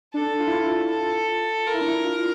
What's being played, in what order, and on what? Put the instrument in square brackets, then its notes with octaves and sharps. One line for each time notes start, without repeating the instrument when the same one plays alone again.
[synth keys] D4 [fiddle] A4
[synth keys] F4
E4
F4
[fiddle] A4
[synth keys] F4 [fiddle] A#4
[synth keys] E4
D4
E4
F4